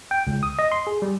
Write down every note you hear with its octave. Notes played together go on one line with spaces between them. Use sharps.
G5
C#2
D#6
D#5
C6
G#4
G3